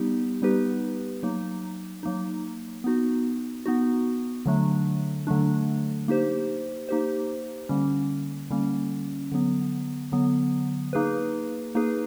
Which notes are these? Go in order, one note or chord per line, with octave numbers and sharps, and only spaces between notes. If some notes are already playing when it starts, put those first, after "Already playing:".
Already playing: G3 B3 D#4 G4
G3 B3 D#4 G4 B4
F#3 A#3 D#4
F#3 A#3 D#4
B3 D#4 F#4
B3 D#4 F#4
D3 F#3 A3 D4
D3 F#3 A3 D4
A#3 D#4 G4 C5
A#3 D#4 G4 C5
D3 G3 A#3 C#4
D3 G3 A#3 C#4
D3 F#3 B3
D3 F#3 B3
A#3 D#4 G#4 B4
A#3 D#4 G#4 B4